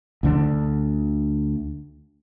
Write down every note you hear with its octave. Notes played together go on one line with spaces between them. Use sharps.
D2 D3 D4